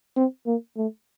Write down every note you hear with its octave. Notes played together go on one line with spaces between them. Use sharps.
C4
A#3
A3